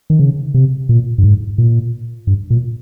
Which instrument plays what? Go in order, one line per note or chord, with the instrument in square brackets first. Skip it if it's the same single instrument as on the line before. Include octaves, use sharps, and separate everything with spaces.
[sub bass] D#3
C#3
C3
A#2
G2
G#2
A#2
G2
A#2